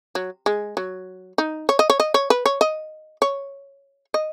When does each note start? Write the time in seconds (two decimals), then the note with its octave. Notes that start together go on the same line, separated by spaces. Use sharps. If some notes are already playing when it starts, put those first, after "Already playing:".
0.15 F#3
0.46 G#3
0.77 F#3
1.38 D#4
1.69 C#5
1.79 D#5
1.90 C#5
2.00 D#5
2.14 C#5
2.30 B4
2.46 C#5
2.61 D#5
3.22 C#5
4.14 D#5